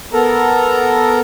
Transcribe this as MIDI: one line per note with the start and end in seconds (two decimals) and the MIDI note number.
0.13 1.20 59
0.13 1.20 69
0.13 1.20 70
0.13 1.20 82